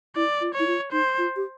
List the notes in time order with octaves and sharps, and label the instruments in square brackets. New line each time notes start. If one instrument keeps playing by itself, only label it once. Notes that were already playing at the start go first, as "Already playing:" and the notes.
[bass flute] E4 [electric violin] D5
[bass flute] F4
[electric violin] C#5
[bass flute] E4
F4
[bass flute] D#4 [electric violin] C5
[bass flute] F4
G4